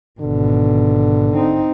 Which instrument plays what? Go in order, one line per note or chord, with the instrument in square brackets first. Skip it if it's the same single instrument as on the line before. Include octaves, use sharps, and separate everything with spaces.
[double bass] G#1 B2 [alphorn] D3
[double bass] C4 D#4